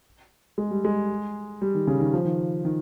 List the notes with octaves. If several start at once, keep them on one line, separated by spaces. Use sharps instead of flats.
G#3
G3
G#3
G3
D#3
C#3
D#3
F3
D#3
D#3